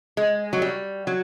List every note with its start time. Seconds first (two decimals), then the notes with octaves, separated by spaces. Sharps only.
0.17 G#3
0.53 F#3
0.62 G3
1.07 F#3